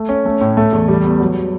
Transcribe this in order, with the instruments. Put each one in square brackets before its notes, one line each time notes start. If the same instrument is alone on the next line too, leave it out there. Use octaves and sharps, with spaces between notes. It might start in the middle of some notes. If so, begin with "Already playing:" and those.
Already playing: [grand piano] A3
C#4
A3
A2
A3
E2
G3
B3
F#3